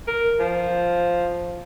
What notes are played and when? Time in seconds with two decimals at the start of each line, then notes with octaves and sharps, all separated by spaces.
0.07 A#4
0.40 F3